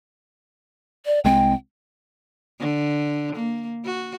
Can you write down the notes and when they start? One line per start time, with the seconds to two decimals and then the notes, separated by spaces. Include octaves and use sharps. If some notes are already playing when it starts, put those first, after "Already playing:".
1.06 D5
1.25 C2 G#3 C4 G5
2.60 D3
3.35 A#3
3.85 F#4